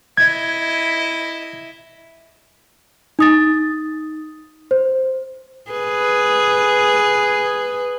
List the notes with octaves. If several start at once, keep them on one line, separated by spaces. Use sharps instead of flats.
E4 D#5 G#6
D#4 D#6 A6
C5
G#4 B4